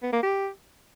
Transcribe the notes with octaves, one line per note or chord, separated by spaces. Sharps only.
B3
A#3
G4